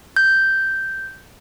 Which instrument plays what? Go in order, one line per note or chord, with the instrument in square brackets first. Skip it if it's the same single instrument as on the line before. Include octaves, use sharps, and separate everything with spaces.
[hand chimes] G6